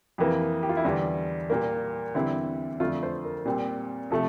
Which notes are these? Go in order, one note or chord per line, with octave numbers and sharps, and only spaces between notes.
F2 E3 A#3 G4
G4
F4
E4
E2 D3 G3 D4
A#2 G3 A#3
E2 D3 G3 C4 E4
F2 D3 A3 F4
C5
A#4
A#2 G3 C4
C3 F3 A3 A4